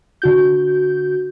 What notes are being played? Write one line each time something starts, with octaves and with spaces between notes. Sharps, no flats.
D3 F#4 G6